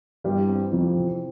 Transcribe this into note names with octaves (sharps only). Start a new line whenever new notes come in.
G2 E3 G3
C4
F2 C3 F3
E3